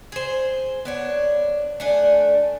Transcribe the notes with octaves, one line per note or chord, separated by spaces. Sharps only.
G#4 C5
B3 D4 C#5
A3 D4 G#5